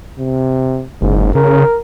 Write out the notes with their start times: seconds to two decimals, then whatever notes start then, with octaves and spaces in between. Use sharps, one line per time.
0.19 C3
1.02 F#1 G#2
1.35 C#3 A#4